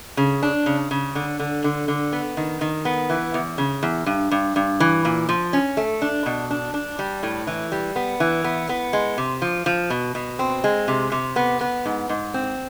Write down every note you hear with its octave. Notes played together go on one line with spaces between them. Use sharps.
C#3
D4
C#3
C#3
D3
D3
D3
D3
B3
D#3
D#3
B3
E3
E2
C#3
E2
G2
G2
G2
E3
A#2
F3
C#4
A3
D4
B2
D4
D4
G3
A2
E3
G3
B3
E3
B3
B3
G#3
C3
F3
F3
B2
B2
C4
G#3
C3
C3
B3
B3
G#2
G#2
C4